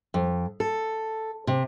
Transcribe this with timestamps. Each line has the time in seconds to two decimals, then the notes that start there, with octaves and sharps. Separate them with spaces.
0.14 F2
0.60 A4
1.47 C3